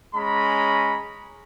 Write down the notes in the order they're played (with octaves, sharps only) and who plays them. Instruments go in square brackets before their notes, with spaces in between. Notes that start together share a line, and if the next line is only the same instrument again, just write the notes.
[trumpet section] G#3 C#4 A#5 B5